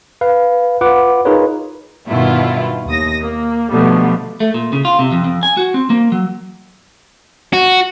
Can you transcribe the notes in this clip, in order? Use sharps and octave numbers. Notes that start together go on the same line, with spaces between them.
B4 F5
F4 B4 F#5 D6
D#4 F4 G#4 A#4 B4 C#5
G2 B2 D#3 E4 F4
D#2 D#6 A#6
A#3
B2 D3 F3 G3 A3 B3
A3
A#2
C#3
F4
C3
F2
F2
G#5
F#4
C4
A#3
F#3
F#4